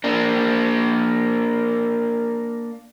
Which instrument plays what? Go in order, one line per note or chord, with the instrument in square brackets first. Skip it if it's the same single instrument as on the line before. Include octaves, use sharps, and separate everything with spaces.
[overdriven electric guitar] A#3 D4